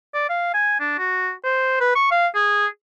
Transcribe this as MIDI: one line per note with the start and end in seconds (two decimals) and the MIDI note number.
0.14 0.29 74
0.29 0.52 77
0.54 0.80 80
0.80 0.95 62
0.99 1.31 66
1.44 1.78 72
1.81 1.95 71
1.95 2.09 85
2.11 2.27 77
2.35 2.66 68